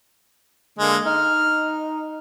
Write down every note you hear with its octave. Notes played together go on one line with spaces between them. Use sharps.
D3 G#3 A#3
D#4 F6